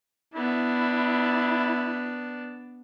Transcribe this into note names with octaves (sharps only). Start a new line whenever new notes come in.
B3 D4 E4